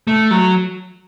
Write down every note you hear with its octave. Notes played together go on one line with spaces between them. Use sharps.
A3
F#3